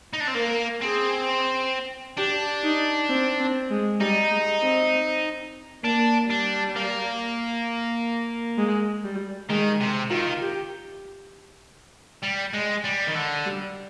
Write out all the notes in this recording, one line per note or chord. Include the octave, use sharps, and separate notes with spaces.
D#4
D4
C4
A#3 A#4
C4 G#4
D4 G4
D#4
C4
C4
G#3
G3 D#4
G#3
C4
A#3 D4
G3 D4
A#3
G#3
G3
D#3 G#3
C3
D#3 F4
G4
G3
G#3
G3
D#3
D3
G3